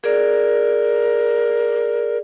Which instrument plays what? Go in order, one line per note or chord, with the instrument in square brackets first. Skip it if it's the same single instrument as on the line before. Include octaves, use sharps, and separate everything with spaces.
[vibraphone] G#4 D5 [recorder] A#4